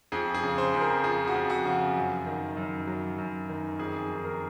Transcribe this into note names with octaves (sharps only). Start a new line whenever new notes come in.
F2 G#4
G#4
C#3
C5
F2
A#4
F3 G#4
F#4
F2
F#4
C#3
F#2
D#3
F#2
F#3
F#2
D#3
F2 G#4
D#3
A#4